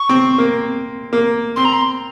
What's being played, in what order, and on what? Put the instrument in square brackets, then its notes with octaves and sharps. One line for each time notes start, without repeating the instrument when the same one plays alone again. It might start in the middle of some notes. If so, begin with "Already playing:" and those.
Already playing: [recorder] C#6
[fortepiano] C4
A#3
A#3
[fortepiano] C4 [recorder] C6
[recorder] A#5
C6